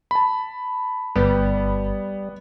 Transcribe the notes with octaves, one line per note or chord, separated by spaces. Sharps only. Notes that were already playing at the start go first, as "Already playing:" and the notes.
A5 B5
G1 G3 B3